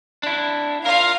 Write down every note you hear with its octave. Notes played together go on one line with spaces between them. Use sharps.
D4 E4
F4 A#4 F5